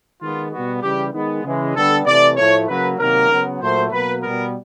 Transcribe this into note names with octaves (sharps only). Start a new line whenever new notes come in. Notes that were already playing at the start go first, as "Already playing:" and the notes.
D#3 G#3 B3 F4
B2 G3 B3 F#4
C#3 E3 G3 G4
D#3 G#3 B3
C#3 E3 G#3
D3 G3 B3 A4
C3 E3 A3 D5
A2 F3 A3 C#5
C#3 F#3 A#3 B4
C3 D#3 F#3 A#3 A#4
C#3 F#3 B3
A#2 F#3 A3 C5
B2 F#3 A#3 B4
B2 G3 B3 A#4